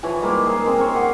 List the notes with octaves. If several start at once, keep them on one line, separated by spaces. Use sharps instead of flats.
E3 F3 C#5 G#5
G3 G#3 A#3 D#4
G#4 A#4 C5
G#3 C4 G#4
A#4 C5 C#5
G4 C5 F#5